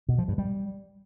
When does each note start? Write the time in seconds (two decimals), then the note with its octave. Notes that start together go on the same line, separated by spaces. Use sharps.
0.09 B2
0.18 F3
0.28 G2
0.38 G3